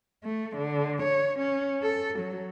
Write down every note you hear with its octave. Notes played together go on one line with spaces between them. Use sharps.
A3
D3
C#5
C#4
A4
F#3